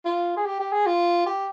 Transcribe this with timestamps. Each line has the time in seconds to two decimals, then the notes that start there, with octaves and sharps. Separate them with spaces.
0.06 F4
0.37 G#4
0.46 G4
0.60 G4
0.72 G#4
0.87 F4
1.26 G4